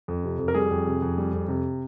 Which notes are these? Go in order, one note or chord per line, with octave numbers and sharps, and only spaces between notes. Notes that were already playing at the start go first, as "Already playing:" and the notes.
F2
C3
F2
A#4
G3 G#4
F2
C3
F2
G3
F2
C3